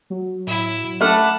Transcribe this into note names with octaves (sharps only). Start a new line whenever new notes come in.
F#3
A2 E4
A3 E5 F#5 A5 B5 D6 F6